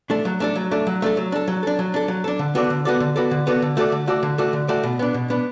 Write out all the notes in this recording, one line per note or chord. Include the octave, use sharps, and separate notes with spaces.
A3 D4 A4
F#3
A3 D4 A4
F#3
A3 D4 A4
F#3
A3 D4 A4
F#3
D4 A4
F#3
D4 A4
F#3
D4 A4
F#3
D4 A4
D3
B3 F#4 A4 D5
D3
B3 F#4 A4 D5
D3
B3 F#4 A4 D5
D3
B3 F#4 A4 D5
D3
A3 F#4 A4 D5
D3
A3 F#4 A4 D5
D3
A3 F#4 A4 D5
D3
A3 F#4 A4 D5
B2
B3 D4
B2
B3 D4